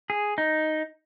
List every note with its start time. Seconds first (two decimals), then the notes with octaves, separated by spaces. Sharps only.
0.10 G#4
0.38 D#4